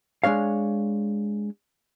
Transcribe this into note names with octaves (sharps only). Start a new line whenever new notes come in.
G#3 D4 C#5 F5